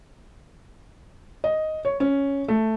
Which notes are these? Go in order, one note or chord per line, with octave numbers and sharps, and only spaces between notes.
D#5
C#5
C#4
A3